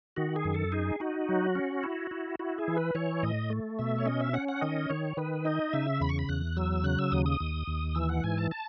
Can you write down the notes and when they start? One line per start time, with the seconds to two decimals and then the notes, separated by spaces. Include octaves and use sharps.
0.16 D#3 F#4
0.36 G#4
0.45 F#2
0.54 A4
0.72 D#4 G#4
1.00 D#4 F#4
1.29 F#3
1.55 C#4
1.83 E4
2.11 E4
2.39 E4 F#4
2.58 G#4
2.68 E3
2.76 B4
2.95 E3 C#5
3.23 A2 D#5
3.50 A3
3.79 B2 E5
3.98 C#5
4.06 C#4 D#5
4.21 E5
4.33 C#4 F#5
4.49 F#5
4.61 D#3 D#5
4.89 D#3 C#5
5.17 D#3 B4
5.45 D#4 D#5
5.73 C#3 E5
6.00 E2 B5
6.09 C#6
6.19 B5
6.29 E2 F#6
6.56 F#3 E6
6.84 C#3 F#6
6.99 E6
7.12 D#2 D#6
7.26 D#6
7.40 D#2
7.67 D#2
7.95 E3 E6
8.09 F#5
8.24 G#2 G#5
8.38 A5
8.51 A5